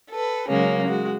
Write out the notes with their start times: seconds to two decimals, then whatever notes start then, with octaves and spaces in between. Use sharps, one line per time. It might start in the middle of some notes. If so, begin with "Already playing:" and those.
0.10 A4 B4
0.49 C#3 F#3 G#3 A#3 C#4
0.87 G#3 F#4